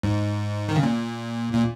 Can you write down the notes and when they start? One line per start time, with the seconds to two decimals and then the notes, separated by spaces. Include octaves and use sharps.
0.03 G#2
0.69 D#3
0.76 C#3
0.83 A#2
1.53 A#2